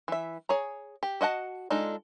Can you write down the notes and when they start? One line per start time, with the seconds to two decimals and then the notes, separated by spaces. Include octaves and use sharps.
0.08 E3 E5
0.49 G#4 C#5 A#5
1.03 G4
1.21 F#4 D#5 F#5 A5
1.70 G#3 D4 D#4 F4 A4